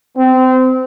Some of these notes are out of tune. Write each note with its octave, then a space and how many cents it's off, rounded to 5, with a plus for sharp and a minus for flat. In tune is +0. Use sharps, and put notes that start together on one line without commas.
C4 -25